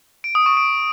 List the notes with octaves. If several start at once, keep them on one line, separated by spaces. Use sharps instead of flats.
D7
D#6
C#6
D7